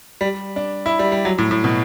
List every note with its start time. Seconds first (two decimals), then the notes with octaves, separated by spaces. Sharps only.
0.21 G3
0.56 D4
0.86 E4
0.99 G3
1.12 G3
1.25 F#3
1.38 A2
1.51 A2
1.64 B2